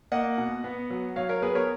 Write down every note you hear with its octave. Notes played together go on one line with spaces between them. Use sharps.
A#3 D#5 F#5
B2
B3
F#3
F#3 C#5 F5
A#4 C#5
B3 G#4 B4
A#4 C#5